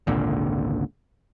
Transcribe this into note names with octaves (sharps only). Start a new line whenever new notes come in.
G#1 C#2 A#2 D3